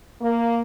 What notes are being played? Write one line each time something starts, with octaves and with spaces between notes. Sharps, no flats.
A#3